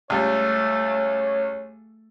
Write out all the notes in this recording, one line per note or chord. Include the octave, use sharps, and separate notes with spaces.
C#2 G3 A3 C#5